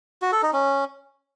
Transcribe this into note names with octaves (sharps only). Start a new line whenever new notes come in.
F#4
A4
D#4
C#4